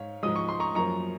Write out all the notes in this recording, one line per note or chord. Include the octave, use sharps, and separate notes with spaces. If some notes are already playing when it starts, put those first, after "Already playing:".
Already playing: G#2 C#5 F5
G#2 F3 G#3 D#6
C#6
C6
A#5 C#6
F#2 F3 A#3 A#5 C#6